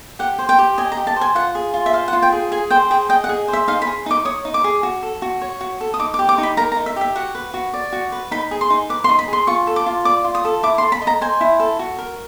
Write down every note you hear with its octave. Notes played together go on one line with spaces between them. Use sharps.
G4 F#5
C5
G5
G4
D#5 G#5
A#5
G4
A5
C5 G#5
F4 F#5
G#4
F4
E5
C5 F5
F#5
F4
G5
G#4
G#4 G#5
C5 G5
G#4 G5
D#5 G5
F#5
G#4
C5
E5
D#4 F5
B5
G#4
D#4 D6
C#5 D#6
D#4
D6
G#4
F#4
A4
F#4
C#5
F#4
A4
D#6
D#4 D6
D6
G4
D6
D#4
B5
A#4 A#5
A#5
D#4
E5
G4 E5
F#4 F#5
B4
F#4
D5
F#4
B4
D#4 B5
G#4
C6
D#4
B4 D6
C6
D#4
B5
G#4 C6
F4 C#6
A4
D6
F4
D5 D6
F4
D#6
A4
E4 D6
C6
A4
B5
D#5
A#5
C5 G#5
E4
A4
F#4
A#4